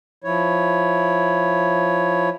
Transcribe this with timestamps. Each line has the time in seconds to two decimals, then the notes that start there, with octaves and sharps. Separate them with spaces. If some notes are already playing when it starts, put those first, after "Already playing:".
0.24 F3 E4 C#5